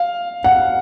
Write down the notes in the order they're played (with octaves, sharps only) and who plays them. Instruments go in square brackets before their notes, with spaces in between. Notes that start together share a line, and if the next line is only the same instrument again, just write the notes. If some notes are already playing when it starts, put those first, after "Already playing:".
Already playing: [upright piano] F5
F#5